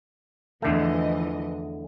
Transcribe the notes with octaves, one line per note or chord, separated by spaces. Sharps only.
E2 D3 E3 F3 A3 D#5